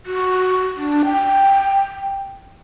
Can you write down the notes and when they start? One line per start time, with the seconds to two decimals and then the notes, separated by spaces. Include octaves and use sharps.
0.06 F#4
0.77 D4
1.05 G5